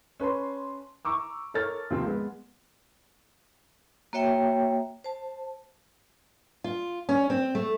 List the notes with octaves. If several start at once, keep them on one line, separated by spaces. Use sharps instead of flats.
C#4 B4 A5 C6
A#5 C#6 D6 E6
A4 A#4 C#5 F6 A6
D#2 C3 F3 C4
G#3 B3
A#3 F#4 C#5 E5 G5
C5 A5
F4
C#4
C4
A3